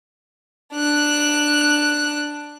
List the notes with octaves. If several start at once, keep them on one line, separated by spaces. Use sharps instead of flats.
D4 F#6